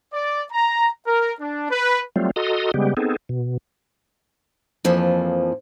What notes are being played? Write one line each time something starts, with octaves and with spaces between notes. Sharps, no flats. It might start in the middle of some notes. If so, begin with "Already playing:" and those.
D5
A#5
A#4
D4
B4
F#3 G3 A3 C4 F4
F#4 A4 D#5 A#5 C6 D#6
C#3 G3 G#3 B3 G4
B3 C4 D#4 G#4 A4
B2
F2 E3 F3 A#3